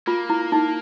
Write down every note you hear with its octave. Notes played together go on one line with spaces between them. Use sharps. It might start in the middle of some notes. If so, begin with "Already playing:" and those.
A#3 F4
E4
D#4